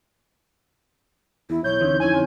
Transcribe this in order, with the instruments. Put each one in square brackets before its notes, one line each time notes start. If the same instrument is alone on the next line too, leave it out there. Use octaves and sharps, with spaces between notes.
[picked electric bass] E2 [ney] E4
[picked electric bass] B1 [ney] C#5 [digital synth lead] G6
[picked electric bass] D2 D3 E3 [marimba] C4 D#4 E4
[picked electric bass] F2 [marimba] C#4 E4 [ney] C#5 [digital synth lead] G#5
[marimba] D3 C4 C#4